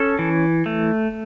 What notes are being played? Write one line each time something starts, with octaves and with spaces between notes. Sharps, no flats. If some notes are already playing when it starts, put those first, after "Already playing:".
Already playing: C#4 A4
E3
A3